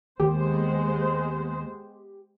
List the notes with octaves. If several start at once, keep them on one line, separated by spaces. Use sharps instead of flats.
D#2 G#3 B3 G4 C5